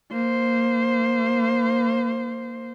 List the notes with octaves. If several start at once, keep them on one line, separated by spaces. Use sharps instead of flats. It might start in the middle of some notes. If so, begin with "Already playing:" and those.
A#3 C5